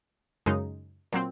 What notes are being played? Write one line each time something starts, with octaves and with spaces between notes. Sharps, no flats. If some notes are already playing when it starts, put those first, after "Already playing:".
F#2 C#3 G#3 D#4
A#2 F#3 C4